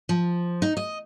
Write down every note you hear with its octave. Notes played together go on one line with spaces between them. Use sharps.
F3
D#4
D#5